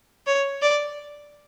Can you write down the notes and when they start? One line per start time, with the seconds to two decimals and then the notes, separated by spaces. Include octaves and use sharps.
0.26 C#5
0.62 D5